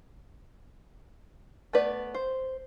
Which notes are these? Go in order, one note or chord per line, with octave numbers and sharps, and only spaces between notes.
A3 B3 B4 D5
C5